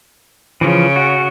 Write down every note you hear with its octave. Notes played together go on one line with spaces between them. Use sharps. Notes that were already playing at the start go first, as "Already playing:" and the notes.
C#3 E3 F3
F#4